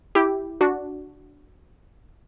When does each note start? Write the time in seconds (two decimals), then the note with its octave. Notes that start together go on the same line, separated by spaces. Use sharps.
0.15 E4 G4
0.61 D4 F#4